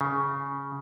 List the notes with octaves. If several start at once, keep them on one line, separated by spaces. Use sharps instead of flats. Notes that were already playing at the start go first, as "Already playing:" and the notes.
C#3